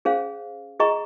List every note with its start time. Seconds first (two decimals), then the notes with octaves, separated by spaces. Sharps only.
0.05 C#4 G#4 C5 F5
0.80 G#4 D#5 A#5 C#6